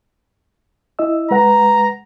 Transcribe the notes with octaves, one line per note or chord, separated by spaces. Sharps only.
E4 D#5 E6
G#3 B4 F#5 A#5